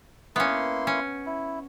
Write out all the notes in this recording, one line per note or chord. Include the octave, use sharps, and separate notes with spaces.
A#3 B3 C#4 E4 C6
C#4
E4